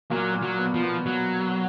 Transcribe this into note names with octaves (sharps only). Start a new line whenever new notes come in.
A#2 F#3 A#3
A#2 A#3
F#3
B2 B3
F3
B2 B3
F#3